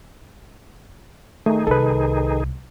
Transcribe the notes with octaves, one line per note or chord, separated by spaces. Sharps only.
D#3 A3 D#4 G#4
C2 A4 B4